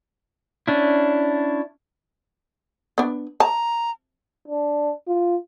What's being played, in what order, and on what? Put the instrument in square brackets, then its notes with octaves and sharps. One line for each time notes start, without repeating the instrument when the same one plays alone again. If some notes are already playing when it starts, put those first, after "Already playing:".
[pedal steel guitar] C#4 D4 E4
[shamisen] B3 D4
[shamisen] A5 [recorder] A#5
[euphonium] D4
F4